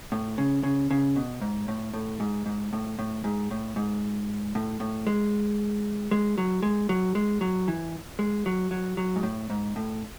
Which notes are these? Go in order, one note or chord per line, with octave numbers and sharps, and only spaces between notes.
A2
C#3
C#3
C#3
B2
G#2
A2
A2
G#2
G#2
A2
A2
G#2
A2
G#2
A2
A2
G#3
G#3
F#3
G#3
F#3
G#3
F#3
E3
G#3
F#3
F#3
F#3
G#2
A2
G#2
A2